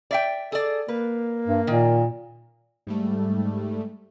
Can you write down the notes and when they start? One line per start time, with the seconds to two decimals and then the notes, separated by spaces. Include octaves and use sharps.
0.11 D5 E5 G5
0.52 G#4 A4 D5
0.88 A#3 B4
1.47 G2
1.67 A#2 D#3
2.87 G#2 G3 A3